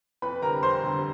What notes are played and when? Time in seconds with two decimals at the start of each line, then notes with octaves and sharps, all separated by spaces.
0.22 F2 B4 B5
0.42 D3 G3 C4 A#4 A#5
0.63 F2 C5 C6
0.83 D3 G3 C4